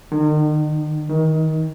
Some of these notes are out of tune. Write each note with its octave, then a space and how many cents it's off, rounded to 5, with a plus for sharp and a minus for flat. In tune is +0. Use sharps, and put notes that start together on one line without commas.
D#3 -40
D#3 +25